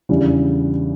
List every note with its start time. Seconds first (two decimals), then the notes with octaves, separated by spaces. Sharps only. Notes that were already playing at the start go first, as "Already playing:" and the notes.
0.09 E2 C#3 G3 D4